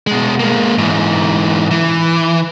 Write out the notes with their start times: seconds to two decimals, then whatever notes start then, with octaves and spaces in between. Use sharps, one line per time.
0.07 B2 G#3
0.39 G#3 A#3
0.78 G#2 E3
1.71 E3